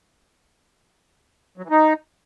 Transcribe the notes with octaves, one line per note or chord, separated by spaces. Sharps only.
F#3
E3
D#4